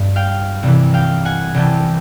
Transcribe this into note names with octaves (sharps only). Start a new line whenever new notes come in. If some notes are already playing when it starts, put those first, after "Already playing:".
Already playing: G2
F5 G5
C2 C3 E3
F5 G5
F#5 G#5
C2 C3 E3 G5 A5